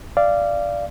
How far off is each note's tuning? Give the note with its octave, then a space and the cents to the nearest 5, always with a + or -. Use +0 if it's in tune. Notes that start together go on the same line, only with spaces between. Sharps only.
D5 +0 F5 -20